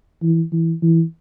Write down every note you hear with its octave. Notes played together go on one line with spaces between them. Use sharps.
E3
E3
E3